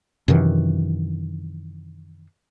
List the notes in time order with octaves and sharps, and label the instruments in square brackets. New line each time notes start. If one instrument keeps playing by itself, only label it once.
[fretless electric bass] F#2 C3 D#3 E3